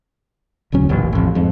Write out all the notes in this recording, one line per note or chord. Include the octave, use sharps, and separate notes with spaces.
E1 D2 F#3 C#4
D#1 A1 D#2
A1 F2
F2 G#2